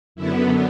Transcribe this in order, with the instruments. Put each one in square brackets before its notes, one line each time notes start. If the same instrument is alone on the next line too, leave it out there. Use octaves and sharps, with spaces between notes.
[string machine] F#2 D3 B3 E4